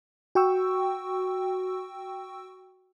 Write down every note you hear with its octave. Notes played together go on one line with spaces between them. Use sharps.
F#4 G5 C#6 E6